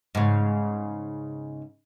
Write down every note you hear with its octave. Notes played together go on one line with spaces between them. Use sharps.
G#2 C#3